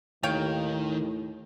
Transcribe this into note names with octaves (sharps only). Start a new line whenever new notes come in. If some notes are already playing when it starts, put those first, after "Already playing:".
D#2 A2 D#3 C#5 F5 G5